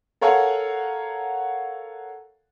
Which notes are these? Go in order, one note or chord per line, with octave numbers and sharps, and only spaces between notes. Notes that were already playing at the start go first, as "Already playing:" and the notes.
A4 A#4 C#5 F5 F#5 G#5